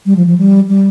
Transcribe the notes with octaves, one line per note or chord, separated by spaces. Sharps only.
G3
F3
F3
G3
G3